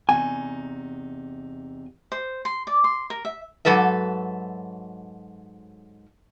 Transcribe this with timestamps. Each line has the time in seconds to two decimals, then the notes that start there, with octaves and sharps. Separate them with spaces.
0.09 E2 C3 D#4 G#5
2.12 C5
2.45 C6
2.67 D5
2.84 C6
3.10 A#4
3.25 E5
3.65 G#2 F#3 A4 B4 E5